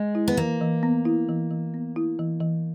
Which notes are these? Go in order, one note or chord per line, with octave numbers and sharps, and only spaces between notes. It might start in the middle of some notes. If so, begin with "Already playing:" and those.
Already playing: G#3
E4
B3
E3 A#3
E3
B3
E4
E3
E3
B3
E4
E3
E3